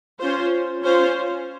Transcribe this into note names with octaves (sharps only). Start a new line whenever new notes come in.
C#4 F4 C5
C#4 F4 C5